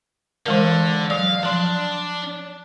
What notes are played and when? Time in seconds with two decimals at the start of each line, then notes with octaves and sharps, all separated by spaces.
0.46 D3 E3 G#3 A#4
1.10 F#3 D5 F5
1.43 F3 D4 C6